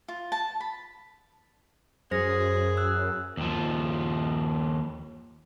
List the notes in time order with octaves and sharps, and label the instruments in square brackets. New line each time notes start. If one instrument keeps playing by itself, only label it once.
[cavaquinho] F4
A5
B5
[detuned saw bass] F#2 [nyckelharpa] G#4 [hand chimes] C5 A#6
[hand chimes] E6 F#6
[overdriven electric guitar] D#2 F3